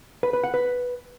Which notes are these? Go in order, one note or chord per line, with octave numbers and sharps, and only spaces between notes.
B4
B4
F#5
B4